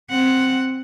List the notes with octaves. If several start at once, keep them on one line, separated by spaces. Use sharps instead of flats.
C4 F#5